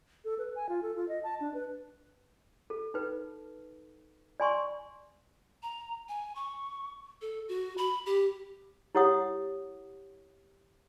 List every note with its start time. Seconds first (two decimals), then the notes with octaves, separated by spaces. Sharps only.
0.25 A4
0.38 B4
0.56 G#5
0.69 F4
0.83 A4
0.96 F4
1.09 D#5
1.23 A5
1.40 D4
1.54 B4
2.70 A4
2.94 D#4 B4
4.40 D5 G#5 C6 C#6
5.63 A#5
6.09 G#5
6.36 C#6
7.22 A4
7.49 F#4
7.78 B5
8.06 G4
8.95 E4 G4 C#5 F#5 D#6